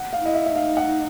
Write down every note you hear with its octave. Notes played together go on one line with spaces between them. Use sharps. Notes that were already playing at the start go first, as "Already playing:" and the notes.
Already playing: F#5
F5
E4 D#5
E5
E5
D#4 F5
F#5